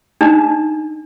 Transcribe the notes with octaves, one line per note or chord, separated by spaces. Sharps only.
D4 D#4